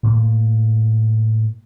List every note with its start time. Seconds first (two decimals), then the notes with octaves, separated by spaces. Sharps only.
0.03 A2 A#3